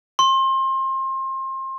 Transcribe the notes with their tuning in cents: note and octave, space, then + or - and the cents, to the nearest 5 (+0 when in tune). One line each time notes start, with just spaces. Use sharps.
C6 +30